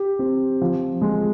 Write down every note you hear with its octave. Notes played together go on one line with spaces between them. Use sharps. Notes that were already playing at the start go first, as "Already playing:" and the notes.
Already playing: G4
C4
F3
G#3